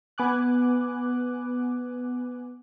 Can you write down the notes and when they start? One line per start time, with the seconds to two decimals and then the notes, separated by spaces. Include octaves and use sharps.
0.18 B3 G#5 D6 F#6